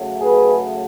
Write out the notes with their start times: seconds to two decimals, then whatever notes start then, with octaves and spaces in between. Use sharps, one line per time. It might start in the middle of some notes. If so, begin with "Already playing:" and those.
Already playing: C#3 F#3 A3
0.21 G#4 B4